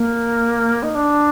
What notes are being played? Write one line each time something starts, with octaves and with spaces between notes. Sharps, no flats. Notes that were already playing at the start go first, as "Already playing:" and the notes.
Already playing: A#3
D#4
D4